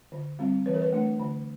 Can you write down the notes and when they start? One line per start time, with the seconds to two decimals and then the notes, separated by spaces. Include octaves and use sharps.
0.12 D3
0.39 G3 C4
0.66 E3 B4
0.74 A#4
0.82 B4
0.93 A3 D4
1.20 D3